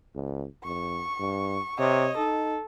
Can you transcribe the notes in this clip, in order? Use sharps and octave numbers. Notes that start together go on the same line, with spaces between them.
C#2
F2 C#6
G2
C3 C#5 D#5
D#4 A4